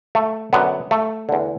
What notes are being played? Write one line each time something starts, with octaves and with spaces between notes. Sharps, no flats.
A3
F#2 D3 B3
A3
E2 D3